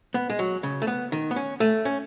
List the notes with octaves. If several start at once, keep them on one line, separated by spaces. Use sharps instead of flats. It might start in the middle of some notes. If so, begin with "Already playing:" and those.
B3
G#3
F#3
C#3
A3
B3
D#3
B3
C#4
A3
C#4